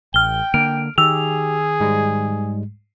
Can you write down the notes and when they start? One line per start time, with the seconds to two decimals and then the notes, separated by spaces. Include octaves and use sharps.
0.14 A1 G5 F6 G7
0.54 D3 A#3 F6 D7
0.98 D#3 G4 G#4 E6 F7
1.80 G#2 G3 G#3